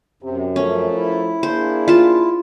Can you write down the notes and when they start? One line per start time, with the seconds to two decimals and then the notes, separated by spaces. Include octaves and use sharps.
0.23 F#2 C3
0.56 F3 A3 C#4 A#4
0.95 E4
1.43 A#3 D4 G#4 C5
1.88 F4 A5